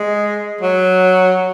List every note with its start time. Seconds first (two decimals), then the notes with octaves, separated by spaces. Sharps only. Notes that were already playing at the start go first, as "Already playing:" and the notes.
Already playing: G#3
0.61 F#3